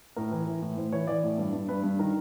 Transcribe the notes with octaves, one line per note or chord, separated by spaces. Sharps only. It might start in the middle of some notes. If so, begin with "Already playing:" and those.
A2 A#4
E3
E3
A2
A2 C5
E3 C#5
E3 D5
A2
G2
G2
G2 B4
G2
D#3 A#4